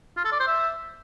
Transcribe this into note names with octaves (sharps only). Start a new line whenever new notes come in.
F4
A4
D5
C5
E5